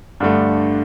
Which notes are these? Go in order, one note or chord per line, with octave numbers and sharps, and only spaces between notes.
G2 D3 A3